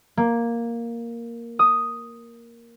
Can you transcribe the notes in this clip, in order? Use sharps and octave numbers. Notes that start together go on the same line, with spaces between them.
A#3
D#6